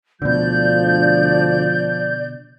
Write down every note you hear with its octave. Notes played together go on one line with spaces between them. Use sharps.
D2 B2 D3 F3 D5 G6